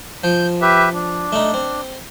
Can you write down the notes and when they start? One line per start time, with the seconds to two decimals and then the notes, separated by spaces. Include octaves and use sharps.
0.24 F3 G6
0.61 G4 B4 E5
0.94 D4
1.32 A3 D#4
1.54 C4